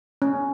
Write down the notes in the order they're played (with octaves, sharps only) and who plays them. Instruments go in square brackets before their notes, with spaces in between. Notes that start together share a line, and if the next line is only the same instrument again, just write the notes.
[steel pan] C#4